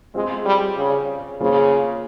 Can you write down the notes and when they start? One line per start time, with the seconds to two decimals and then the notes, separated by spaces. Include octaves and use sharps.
0.15 G#3 C4 F4 G#4
0.45 G3
0.77 C#3
1.40 C#3 A#3 F4 G#4 C5